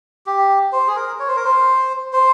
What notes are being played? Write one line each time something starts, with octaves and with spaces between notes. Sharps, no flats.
G4
C5
G#4
A#4
C#5
C5
A#4
C5
C5